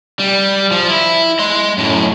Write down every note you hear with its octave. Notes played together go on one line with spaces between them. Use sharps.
G3
F3
E4
D#5 C6
F#2 A2